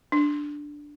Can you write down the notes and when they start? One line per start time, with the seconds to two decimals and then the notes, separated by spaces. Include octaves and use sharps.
0.12 D4